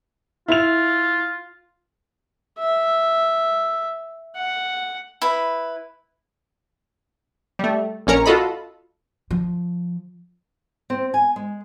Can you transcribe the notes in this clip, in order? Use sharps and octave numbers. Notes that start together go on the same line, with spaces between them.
E4 F4 F7
E5
F#5
E4 B4
G3 A3
A#1 C#4 A#4 C#7
F4 F#4 A4 D#5 B5
F3
C4
G#5
G#3